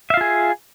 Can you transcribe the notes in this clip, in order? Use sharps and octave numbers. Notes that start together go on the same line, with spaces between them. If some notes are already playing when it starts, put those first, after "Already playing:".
F4 G#4 E5 F5